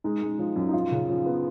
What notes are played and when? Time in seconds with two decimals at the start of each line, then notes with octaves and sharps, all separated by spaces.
0.04 G#3 D#4
0.22 G#3
0.39 F3
0.56 F#2
0.69 D#4
0.73 F3 F4
0.91 C#3
1.09 F3
1.26 B3